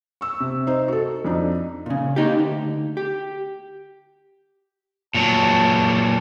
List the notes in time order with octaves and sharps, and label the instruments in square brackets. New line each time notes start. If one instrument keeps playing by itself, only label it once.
[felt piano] C#6 E6
C3
D#4 C5
F#4 A4
F2 D4 D#4
[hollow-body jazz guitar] A#2 C#3
A#3 D#4 G4
D2
G4
[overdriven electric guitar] A#2 F#3 [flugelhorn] A5